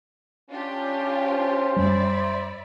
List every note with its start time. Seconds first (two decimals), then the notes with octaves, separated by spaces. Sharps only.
0.49 C#4 D4 F4 G4
1.26 C5
1.76 F#2 G3 D5 E5 B5